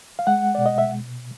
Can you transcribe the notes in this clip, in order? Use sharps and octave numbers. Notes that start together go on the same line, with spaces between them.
F5
G#3 F#5
B2 D5
D#5
E5